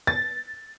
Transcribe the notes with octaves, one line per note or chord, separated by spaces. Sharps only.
A6